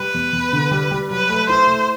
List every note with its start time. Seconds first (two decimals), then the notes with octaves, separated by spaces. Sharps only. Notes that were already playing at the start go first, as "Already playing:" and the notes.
Already playing: G3 B4
0.14 E2
0.33 E2
0.53 D3
0.71 G3
0.91 G3
1.10 F#3 B4
1.29 A3
1.49 E4 C5
1.67 A3